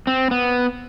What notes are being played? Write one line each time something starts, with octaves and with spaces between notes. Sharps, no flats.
C4
B3